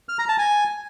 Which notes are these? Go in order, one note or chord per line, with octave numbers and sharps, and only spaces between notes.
F6
A#5
A5
G#5